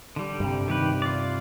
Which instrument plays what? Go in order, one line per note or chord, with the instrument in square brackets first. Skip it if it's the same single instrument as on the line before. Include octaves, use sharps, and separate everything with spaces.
[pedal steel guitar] D3 G3
[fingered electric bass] G2 C3
[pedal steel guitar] D#3 G4 B4
F4 D5